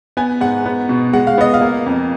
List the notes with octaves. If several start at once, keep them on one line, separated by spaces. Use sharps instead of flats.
B3 G#5
G#2 F#5
B3
B2
G#3 F#5
F5
B3 D#5
F5
A#3
F2